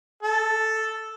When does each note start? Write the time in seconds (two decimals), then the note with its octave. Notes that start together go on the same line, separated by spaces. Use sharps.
0.23 A4